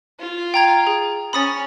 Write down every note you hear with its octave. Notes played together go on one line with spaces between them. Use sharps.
F4
G5 A#5 G#6
G#4
C#4 B5 D#6 A6